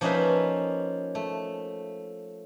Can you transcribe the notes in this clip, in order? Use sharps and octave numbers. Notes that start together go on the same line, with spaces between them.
F3 A#3 C#4 D#4 B4 E5
A3